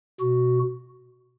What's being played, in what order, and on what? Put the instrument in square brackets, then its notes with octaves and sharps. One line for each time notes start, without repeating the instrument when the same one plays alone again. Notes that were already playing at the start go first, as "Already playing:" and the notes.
[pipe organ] B2 F#4